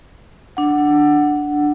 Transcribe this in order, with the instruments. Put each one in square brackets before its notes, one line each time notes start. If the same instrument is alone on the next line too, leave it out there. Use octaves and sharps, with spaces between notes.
[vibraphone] D4 F#5